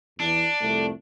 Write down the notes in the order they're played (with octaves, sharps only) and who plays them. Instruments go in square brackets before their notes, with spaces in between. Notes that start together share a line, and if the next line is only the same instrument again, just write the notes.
[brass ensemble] E2 [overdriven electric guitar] D4
[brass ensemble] C2 F2 A3